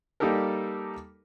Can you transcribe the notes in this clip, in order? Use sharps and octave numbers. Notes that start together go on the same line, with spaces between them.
G3 A#3 D#4 G4 A4 A#4